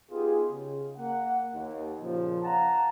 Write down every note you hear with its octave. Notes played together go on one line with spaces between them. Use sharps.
B3 D#4 F4 G4 G#4
C#3
A#3 F#5
D#2
A#2 C#3 F3
F5 F#5 A5 A#5